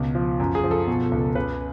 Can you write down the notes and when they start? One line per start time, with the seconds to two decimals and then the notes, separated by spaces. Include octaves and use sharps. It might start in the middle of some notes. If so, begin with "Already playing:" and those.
Already playing: C#2 B2
0.15 F3
0.40 F#2
0.55 G#4
0.64 F3
0.71 A4
0.87 B2
1.12 C#2
1.35 C#3 B4